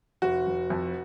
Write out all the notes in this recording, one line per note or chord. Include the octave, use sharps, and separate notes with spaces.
F1 F#4
F1
F2